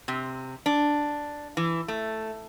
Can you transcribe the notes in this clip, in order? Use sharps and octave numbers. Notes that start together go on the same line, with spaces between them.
C3
D4
E3
A3